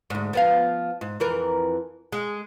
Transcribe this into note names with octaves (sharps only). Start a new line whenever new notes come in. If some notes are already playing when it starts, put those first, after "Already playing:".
D2 G#2
F3 B3 F5
G#2
F2 E3 A#4
G#3